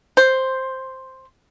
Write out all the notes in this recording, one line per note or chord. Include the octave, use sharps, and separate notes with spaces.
C5